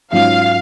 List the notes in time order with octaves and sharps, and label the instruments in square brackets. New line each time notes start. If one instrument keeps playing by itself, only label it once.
[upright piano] G#2 F#3 C#4 F4 [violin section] F5